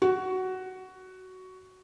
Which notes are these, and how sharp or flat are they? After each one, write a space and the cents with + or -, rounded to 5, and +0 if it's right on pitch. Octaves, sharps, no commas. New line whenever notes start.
F#4 +10